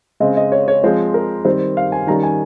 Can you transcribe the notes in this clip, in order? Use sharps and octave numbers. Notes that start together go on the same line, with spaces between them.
C#3 G#3 C4 D#5
D#5
C#5
C#5
F3 G#3 C4 C5
A#4
D#3 G3 C4 C5
F5
G#5
D#3 G3 C#4 A#5
G#5